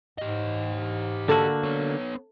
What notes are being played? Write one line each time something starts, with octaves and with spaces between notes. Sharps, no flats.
G#2 G4 D#5
D3 A#3 F#4 A4
B3 C#5